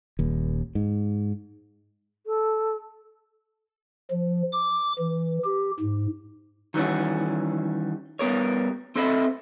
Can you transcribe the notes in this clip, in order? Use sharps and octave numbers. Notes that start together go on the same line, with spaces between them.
D#1 D#2
G#2
A4
F3
D6
E3
G4
G#2
D#3 E3 G3 C#4 F#4
G3 B3 A#4 C#5
C4 A4 C5 D#5 E5 B5